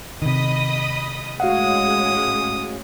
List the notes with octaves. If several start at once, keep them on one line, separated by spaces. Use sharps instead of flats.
C3 D#3 D#5 B5 D#6
A2 G#3 C#4 F#4 F5 F#5 D#6